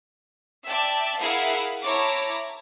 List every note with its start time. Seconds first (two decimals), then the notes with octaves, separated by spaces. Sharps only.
0.66 D5 E5 G5 A5
1.21 E4 G#4 A#4 F5 F#5
1.84 E4 C#5 A5 A#5 D6